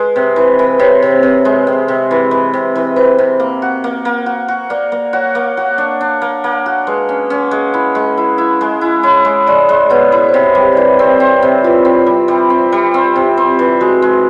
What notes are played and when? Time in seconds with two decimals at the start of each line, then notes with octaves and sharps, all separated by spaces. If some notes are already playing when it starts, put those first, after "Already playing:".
Already playing: G#3 B4
0.16 C3
0.36 E3 C5
0.59 E3
0.80 C3 C#5
1.02 C3
1.23 C3
1.45 G#3
1.67 C3
1.88 C3
2.11 E3
2.31 E3
2.53 C3
2.75 E3
2.96 E3 C5
3.18 C3
3.40 A#3
3.62 F#4
3.84 A#3
4.05 A#3
4.26 F#4
4.48 F#4
4.70 A#3 D5
4.92 A#3
5.13 F#4 C#5
5.35 A#3
5.57 F#4
5.78 D4
6.01 D4
6.22 A#3
6.44 A#3
6.66 F#4
6.87 G#3 B4
7.09 C#4
7.30 C#4
7.51 G#3
7.74 E4
7.95 G#3
8.18 E4
8.38 E4
8.61 G#3
8.81 E4
9.03 E4 C#5
9.25 G#3
9.47 G#3 D5
9.69 G#3
9.90 B2 C#5
10.12 E4
10.29 C5
10.34 C3 C#5
10.55 G3
10.73 D5
10.77 E3 C#5
10.99 C4
11.20 C4
11.42 C3
11.63 E3 F4
11.85 C4
12.06 G3
12.28 G3
12.50 C4
12.72 G3
12.94 C4
13.16 C3
13.38 C4
13.59 E3
13.80 G#3 F#4
14.02 G#3